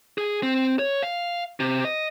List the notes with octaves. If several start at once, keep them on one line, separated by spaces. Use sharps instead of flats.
G#4
C4
C#5
F5
C3
D#5